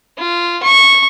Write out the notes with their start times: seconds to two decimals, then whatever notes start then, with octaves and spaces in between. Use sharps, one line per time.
0.18 F4
0.63 C#6